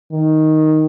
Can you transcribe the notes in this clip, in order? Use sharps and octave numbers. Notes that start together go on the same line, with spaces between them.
D#3